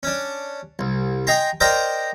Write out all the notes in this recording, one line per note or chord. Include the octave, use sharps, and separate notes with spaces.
C#4 D4
C2
D#5 G5 G#5 A#5 C6
A#4 C5 D5 D#5 G5 A#5